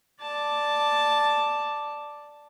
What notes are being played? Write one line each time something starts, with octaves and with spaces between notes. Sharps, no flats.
D5 A5